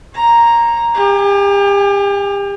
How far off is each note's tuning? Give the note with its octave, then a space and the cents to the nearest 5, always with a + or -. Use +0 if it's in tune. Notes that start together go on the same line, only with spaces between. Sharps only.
C#5 -35 A#5 +0
G4 +35 G#5 +0